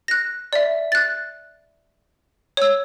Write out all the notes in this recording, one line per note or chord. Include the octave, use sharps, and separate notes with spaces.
F#6 A#6
D5 E5
F#6 A6
C#5 E6